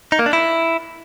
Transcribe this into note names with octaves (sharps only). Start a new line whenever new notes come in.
D#4
A#3
D4
E4